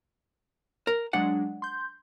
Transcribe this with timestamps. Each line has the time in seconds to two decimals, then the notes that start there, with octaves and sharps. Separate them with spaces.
0.87 A#4
1.13 F#3 G#3 D4 F#5
1.62 C6 G6